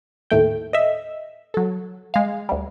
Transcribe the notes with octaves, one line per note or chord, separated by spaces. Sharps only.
D#2 A2 A3 G5
D#5 E5
F#3 A4
G#3 F5
D2 G3